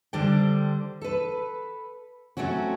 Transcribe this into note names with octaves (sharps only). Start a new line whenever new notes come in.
D3 G3 D4 C5 G5
A4 B4
F#3 A3 C4 C#4 F#4